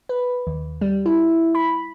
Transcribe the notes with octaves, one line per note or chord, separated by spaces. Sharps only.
B4
D#2
G3
E4
B5